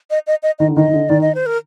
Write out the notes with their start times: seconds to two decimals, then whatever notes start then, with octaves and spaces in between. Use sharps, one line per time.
0.11 D#5
0.27 D#5
0.43 D#5
0.59 D#3 D#5
0.68 D3
0.76 D#3 D#5
0.88 D#3
0.94 D3
1.09 D#3 D5
1.21 D#5
1.35 C5
1.46 A#4